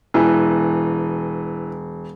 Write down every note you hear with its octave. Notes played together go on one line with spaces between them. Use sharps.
E1 E3